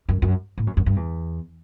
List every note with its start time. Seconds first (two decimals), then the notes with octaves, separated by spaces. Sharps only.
0.09 F#2
0.22 F#2
0.58 A2
0.67 F#2
0.77 F#2
0.86 G2
0.96 E2